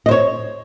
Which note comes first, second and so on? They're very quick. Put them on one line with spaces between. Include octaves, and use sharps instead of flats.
D#5 C5 C#5